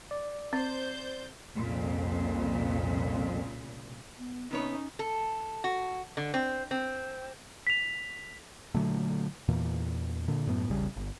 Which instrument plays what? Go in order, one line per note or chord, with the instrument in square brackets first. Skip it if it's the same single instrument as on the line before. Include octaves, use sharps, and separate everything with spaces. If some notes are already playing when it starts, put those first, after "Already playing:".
[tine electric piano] D5
[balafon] C4 [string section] C5 G6 A6
[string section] C2 A#2 C#3 [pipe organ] F2
[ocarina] B3
[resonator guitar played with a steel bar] C3 B3 C#5 [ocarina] C#4 [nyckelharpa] D#4
[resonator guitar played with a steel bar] A4
F#4
D3
C4
C4
[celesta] B6 F7
[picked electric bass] A#2 D3 F#3 A3
E2 A#2 E3
A#2 D3
F#2 A2 B3
E1 A#1 C#3 G3
G1